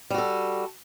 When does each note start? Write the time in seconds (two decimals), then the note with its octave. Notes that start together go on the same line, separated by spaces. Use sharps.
0.10 G3
0.14 F#4
0.18 A4